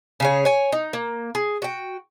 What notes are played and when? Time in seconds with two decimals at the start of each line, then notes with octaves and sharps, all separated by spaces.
0.20 C#3 G#4 C#5
0.45 C#5 G#5
0.72 D#4
0.93 A#3
1.35 G#4
1.62 F#4 G5